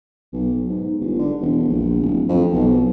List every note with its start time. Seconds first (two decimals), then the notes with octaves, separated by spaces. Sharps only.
0.32 B1
0.68 G#2
1.00 G1
1.19 D3
1.41 E1
1.69 A#1
2.00 D1
2.29 F2
2.53 B1